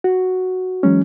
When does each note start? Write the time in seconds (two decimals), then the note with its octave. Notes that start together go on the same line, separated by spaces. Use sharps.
0.04 F#4
0.83 E3 F#3 G#3 C#4